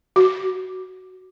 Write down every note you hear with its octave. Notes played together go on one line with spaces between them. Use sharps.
F#4